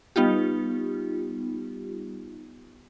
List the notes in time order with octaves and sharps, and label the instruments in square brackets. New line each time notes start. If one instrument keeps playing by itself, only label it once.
[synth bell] G3 B3 D#4 F4 G4